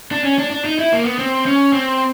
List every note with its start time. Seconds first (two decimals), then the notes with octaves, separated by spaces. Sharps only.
0.11 D4
0.24 C#4
0.39 D4
0.51 D4
0.65 D#4
0.79 E4
0.92 A#3
1.05 B3
1.19 C4
1.46 C#4
1.73 C4